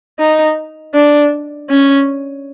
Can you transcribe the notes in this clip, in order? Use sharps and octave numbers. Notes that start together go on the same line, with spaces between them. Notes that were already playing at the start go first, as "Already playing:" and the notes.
D#4
D4
C#4